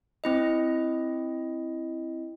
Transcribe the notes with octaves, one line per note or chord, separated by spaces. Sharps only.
C4 E4 D#5